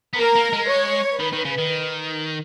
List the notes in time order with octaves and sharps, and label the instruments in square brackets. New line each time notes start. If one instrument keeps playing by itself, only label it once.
[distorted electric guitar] B3
[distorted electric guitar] A#3 [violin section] A#4
[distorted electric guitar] A#3
G#3
[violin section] C#5
[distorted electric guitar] D#3 [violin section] B4
[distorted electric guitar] D#3
C#3
D#3